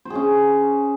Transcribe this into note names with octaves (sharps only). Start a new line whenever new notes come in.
C#4 G#4 C5